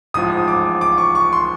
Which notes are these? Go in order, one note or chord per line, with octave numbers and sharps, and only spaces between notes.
A1 G#2 F3 D#6
D6
D6
C#6
C#6
C6